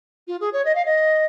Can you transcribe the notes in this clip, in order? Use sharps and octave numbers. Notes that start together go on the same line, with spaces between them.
F4
G#4
C#5
D#5
F5
D#5